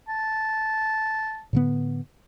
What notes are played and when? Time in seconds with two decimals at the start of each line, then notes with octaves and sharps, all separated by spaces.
0.09 A5
1.53 A2 D3 B3